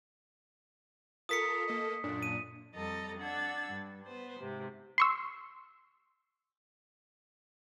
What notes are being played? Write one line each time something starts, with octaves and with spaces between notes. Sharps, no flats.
F4 A4 A#4 D#6 B6 C#7
A#3 A4 D#5
F#2 A#2 D4
D#7
F2 G3 A4 D#5 A#5 A6
D4 F#5 E6 G#6 A6
G2
B3 B4 C5
G#2 C3
C6 C#6 E6